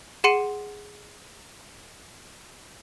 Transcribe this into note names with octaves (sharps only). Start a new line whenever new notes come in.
G#4 F#5 C6 C#7 D#7